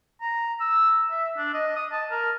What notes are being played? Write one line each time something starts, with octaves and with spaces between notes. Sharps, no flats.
A#5
E6
E5
D4
D#5
D#6
A5
A#4